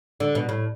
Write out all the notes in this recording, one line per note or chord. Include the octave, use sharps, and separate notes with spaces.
D3
B2
A2